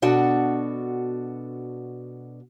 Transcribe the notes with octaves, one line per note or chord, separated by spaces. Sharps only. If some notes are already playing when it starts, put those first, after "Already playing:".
B2 D4 F#4 A4 F#5